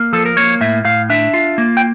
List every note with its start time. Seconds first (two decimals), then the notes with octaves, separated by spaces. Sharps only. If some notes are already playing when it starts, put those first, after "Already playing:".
Already playing: A#3
0.13 F3 A4
0.25 A#4
0.37 A#3 C#5
0.61 A2 E5
0.85 A2 F5
1.10 D4 E5
1.33 F4
1.58 A#3
1.77 G5